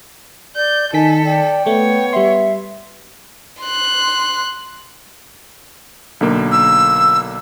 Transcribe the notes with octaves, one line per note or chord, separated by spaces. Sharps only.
D5 G6
D#3 D#4 A4 G#5 B6
D5 G5
A3 B3 C#5
G3 E5 C6
C6 F#6
B1 D3 A#3
E6